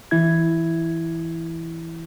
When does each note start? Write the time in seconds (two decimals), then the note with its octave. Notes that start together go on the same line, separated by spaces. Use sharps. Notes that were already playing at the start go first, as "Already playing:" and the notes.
0.11 E3 E4 G#6